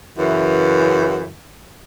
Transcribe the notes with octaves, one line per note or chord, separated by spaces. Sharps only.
F#2 C#3 E3